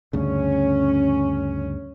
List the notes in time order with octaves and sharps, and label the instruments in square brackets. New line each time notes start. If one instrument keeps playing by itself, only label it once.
[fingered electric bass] D2 G2 C#3 [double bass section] C#4